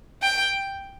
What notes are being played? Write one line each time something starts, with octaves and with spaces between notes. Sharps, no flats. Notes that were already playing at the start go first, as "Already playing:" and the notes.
G5